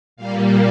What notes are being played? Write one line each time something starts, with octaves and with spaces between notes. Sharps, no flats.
A#2 G3 A#3 F5